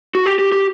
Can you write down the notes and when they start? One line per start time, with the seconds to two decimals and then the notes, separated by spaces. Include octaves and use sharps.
0.15 F#4
0.26 G4
0.39 G4
0.52 G4